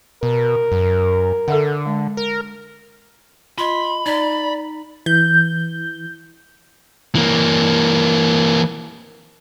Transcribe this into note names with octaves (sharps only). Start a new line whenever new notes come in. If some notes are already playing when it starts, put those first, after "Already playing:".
B2 A#4
F#2
D3 A4 E5 F#5
G#3
A#4
F4 D#5 B5 C6
D#4 D5 A#5 B6
E3 G6
E3 A#3